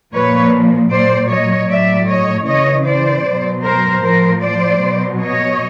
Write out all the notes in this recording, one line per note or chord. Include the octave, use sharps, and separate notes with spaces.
A#2 F3 B4 C#5
A#2 F#3 C5 D5
C#5 D#5
A2 F#3 D5 E5
C#5 D#5
C#3 E3 C#5 D#5
C5 D5
B2 F#3
A#4 C5
A2 F3 A#4 C5
C5 D5
B2 F#3
C#5 D#5